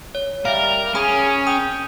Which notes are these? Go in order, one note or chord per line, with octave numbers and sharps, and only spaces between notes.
C#5
G3 A#4 E5 F5
C#4 G#4 B5
G5 D#6